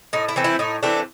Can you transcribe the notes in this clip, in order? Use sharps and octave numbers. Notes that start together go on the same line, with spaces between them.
A2 D#4
E4
E3 A3 C4
E4
A2 D#4
E3 A3 C4 D4